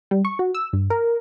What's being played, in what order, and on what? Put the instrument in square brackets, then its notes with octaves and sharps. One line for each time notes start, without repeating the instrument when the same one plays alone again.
[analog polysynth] G3
C#6
F#4
E6
G2
A#4